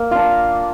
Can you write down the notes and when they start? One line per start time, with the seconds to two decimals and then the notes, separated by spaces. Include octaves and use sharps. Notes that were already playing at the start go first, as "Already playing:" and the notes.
Already playing: A#3
0.11 D4 F4